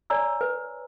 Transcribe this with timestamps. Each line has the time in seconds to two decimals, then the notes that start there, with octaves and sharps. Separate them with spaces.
0.10 C#5 D5 G#5 A#5 E6
0.41 B4